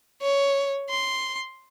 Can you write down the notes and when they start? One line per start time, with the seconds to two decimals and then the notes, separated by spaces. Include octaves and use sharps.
0.22 C#5
0.90 C6